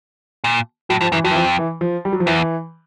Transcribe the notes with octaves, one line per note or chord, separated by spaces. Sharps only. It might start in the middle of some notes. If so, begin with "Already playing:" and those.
A#2
A2 F#3
G2 F3
F#2 E3
F2 F#3
E3
F3
E3
F3
G3
F#3
F3
E2 E3